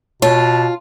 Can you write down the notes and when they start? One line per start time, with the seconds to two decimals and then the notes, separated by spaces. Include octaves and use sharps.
0.22 B2 F4 C#5 A5